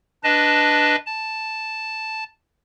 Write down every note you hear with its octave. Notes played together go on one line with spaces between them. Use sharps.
D4 B4 D#5 A5
A5